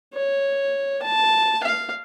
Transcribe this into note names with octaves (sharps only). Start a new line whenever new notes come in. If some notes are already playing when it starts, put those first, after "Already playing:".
C#5
A5
F5